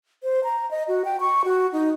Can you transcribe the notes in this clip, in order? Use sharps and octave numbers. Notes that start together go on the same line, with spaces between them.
C5
A#5
D#5
F#4
G5
C#6
F#4
D#4